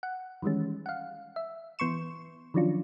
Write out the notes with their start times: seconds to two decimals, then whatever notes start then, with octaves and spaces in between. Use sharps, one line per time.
0.03 F#5
0.42 D#3 E3 G3 G#3 C#4
0.86 F5 F#5
1.36 E5
1.79 E3 B3 C6 C#6 E7
2.54 D#3 F3 F#3 C#4 D4 F4